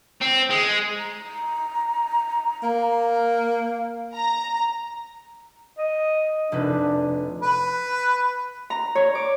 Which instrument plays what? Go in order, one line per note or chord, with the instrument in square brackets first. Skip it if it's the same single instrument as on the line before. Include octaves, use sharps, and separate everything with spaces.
[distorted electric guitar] C4
G#3
[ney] A#5
[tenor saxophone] A#3
[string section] A#5
[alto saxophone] D#5
[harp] F1 D#4 B4 [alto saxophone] D4
[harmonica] B4
[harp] A#5
C#5
D6